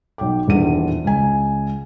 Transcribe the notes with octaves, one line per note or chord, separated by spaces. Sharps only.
B1 G5 D6
D#1 E2 D4 D#7
C#2 G#5